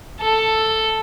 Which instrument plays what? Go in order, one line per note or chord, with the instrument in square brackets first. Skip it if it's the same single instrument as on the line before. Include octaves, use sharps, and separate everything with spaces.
[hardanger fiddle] A4